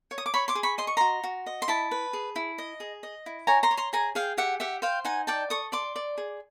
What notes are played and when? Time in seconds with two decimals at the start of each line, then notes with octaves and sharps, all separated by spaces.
0.11 C#5
0.18 D#6
0.26 D6
0.34 C#5 B5 C#6
0.48 C6 D6
0.55 G#4
0.63 B5 C#6
0.78 D#5 C6
0.87 C#6
0.97 F#4 A#5 C6
1.24 F#4
1.46 D#5
1.62 C6
1.68 E4 A5 B5
1.91 B4
2.13 G#4
2.36 E4
2.58 D#5
2.80 G#4
3.03 D#5
3.26 E4
3.47 C#5 G#5 A#5
3.63 A#5 C6
3.71 C#5
3.77 A#5 C6
3.93 G#4 G#5 A#5
4.15 G#4 F5 G5
4.38 G4 E5 F#5
4.60 G4 E5 F#5
4.82 C5 F5 G5
5.05 D#4 F#5 G#5
5.27 D5 G5 A5
5.50 A4 C#6 D#6
5.72 D5 C6 D6
5.96 D5
6.18 G#4